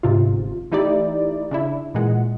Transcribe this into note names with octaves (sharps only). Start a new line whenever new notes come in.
G1 G#2 C3 F4
E3 A3 D#4 E4 G4 D5
C#3 D4 E4
A#2 E3 G#3 F#5